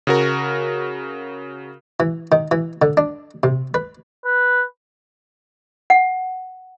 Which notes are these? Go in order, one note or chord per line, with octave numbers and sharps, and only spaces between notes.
C#3 F#4 A#4
E3
D#3
E3
D3
D4
C3
B4
B4
F#5